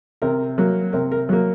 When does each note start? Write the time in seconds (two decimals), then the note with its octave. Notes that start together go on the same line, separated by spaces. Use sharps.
0.22 C3 A#4
0.58 F#3 A#3
0.93 C3 A#4
1.12 A#4
1.29 F#3 A#3